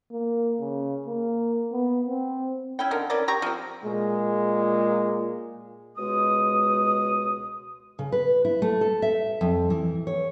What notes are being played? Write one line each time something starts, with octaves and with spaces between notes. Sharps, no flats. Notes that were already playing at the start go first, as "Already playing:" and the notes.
A#3
C#3
A#3
B3
C4
C#4 E4 G5
D3 D#3 A#4
E3 C#4 A#4 D5
G4 A#5 C#6
F3 C4
A#2 G#3
C#2 B2 G#3 D#6
C#3
B4
E4
A3
A4
E5
F2
E3
C#5